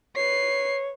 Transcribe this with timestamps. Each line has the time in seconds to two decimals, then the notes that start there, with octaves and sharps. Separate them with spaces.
0.16 B4 C#5 C7